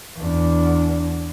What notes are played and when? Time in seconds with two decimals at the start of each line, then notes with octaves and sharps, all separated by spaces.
0.18 E2 D4